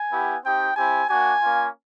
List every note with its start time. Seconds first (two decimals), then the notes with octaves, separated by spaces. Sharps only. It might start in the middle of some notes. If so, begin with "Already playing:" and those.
Already playing: G#5
0.12 B3 E4 G4
0.44 C4 D#4 G4 G5
0.77 C4 E4 G4 G#5
1.10 A#3 D4 F#4 G#5
1.43 A#3 C#4 F4